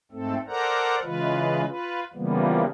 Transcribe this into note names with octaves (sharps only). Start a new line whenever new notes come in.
G#2 A3 C4 A4
A4 A#4 C5 D5 F#5 A#5
C#3 E3 G#3 F4 B4
F4 B4
C#3 E3 F3 G3 A#3 B3